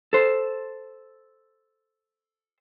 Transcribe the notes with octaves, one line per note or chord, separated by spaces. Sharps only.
A4 C5